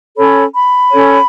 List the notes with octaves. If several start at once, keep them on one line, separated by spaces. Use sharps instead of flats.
C#4 A4 C#5 B5
B5
C#4 A4 C#5